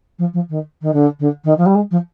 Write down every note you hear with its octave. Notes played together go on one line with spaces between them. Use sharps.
F3
F3
D#3
D#3
D3
D3
D#3
F3
G3
G#3
F3